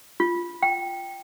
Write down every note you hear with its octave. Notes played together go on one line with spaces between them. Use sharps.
F4
G5